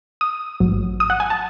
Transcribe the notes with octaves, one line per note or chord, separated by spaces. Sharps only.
D#6
A1 G#2 F#3
D#6
F#5
G#5
A5